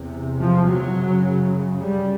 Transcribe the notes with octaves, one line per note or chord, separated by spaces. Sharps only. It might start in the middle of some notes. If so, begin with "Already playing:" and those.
Already playing: E2 C3
F3
F#3
F#2 C#3
G3